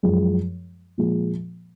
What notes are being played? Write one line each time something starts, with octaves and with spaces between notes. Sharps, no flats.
F#2 F3 G#3
A#2 F3 G#3